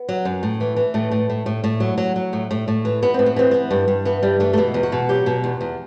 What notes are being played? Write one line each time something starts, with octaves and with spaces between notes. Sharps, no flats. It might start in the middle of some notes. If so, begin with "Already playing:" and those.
Already playing: B3
F#3
F#2
A2
E3
E3
A2 A3
A2
A2
A2
A2
F#3
F#3
F#3
A2
A2
A2
E3
E3 B3
A2 C4
B3
E3 C4
E3 B3
G2
G2
E3 B3
G2 G3
E3 A3
A3
B2 B3
E2
F#4
B2
F#3 G4
B2
E2
E2